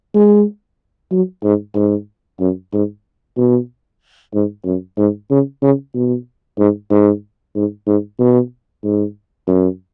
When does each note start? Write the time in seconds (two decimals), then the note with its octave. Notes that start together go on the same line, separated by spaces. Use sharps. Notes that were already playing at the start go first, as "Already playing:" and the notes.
0.14 G#3
1.12 F#3
1.44 G#2
1.75 G#2
2.40 F#2
2.73 G#2
3.37 B2
4.34 G#2
4.65 F#2
4.98 G#2
5.30 C#3
5.62 C#3
5.94 B2
6.59 G#2
6.90 G#2
7.55 G#2
7.87 G#2
8.19 B2
8.84 G#2
9.48 F#2